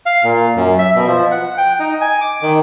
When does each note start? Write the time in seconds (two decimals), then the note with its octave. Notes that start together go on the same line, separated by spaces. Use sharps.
0.06 F5
0.24 A#2
0.56 F#2
0.79 E5
0.95 B2
1.07 F3
1.31 F#5
1.58 G5
1.80 D#4
2.01 G#5
2.21 D6
2.42 D#3